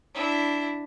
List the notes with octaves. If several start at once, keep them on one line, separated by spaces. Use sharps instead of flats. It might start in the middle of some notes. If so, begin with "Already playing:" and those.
D4 E4